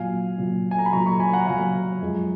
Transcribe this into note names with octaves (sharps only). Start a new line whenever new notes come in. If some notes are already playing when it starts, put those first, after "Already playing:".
Already playing: A#2 F#3 F5 G#5
A#2 F#3
G#5
A#5
B5
A#2 F#3 A#5 C#6
A#5 C#6
G#5 B5
F#5 A#5
A#2 F#3 F5 G#5
F#2 F3 G#3